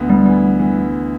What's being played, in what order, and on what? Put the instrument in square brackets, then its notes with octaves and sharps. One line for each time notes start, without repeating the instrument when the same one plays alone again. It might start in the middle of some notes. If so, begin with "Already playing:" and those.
Already playing: [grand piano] D2 B3
[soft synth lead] G3
[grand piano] E3 [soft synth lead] G3
[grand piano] E3